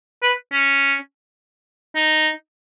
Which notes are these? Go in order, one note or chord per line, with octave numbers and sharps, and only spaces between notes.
B4
C#4
D#4